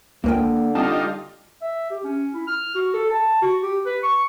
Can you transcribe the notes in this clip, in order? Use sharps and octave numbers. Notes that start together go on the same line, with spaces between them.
C#2 D3 A#3 A#4 G5
G3 C4 D#4 F4 A5
E5
G4
C#4
E4
F6
F#4
A4
A5
F#4
G4
B4
C#6